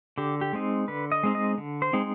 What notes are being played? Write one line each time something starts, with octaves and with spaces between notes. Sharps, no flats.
D3 G4
G4
G#3 C4 D#4
D3 B4
D#5
G#3 C4 D#4
D#5
D3
C5
G#3 C4 D#4